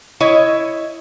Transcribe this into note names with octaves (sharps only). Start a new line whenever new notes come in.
E4 C#5 D#5